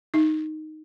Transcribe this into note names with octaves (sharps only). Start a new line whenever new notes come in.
D#4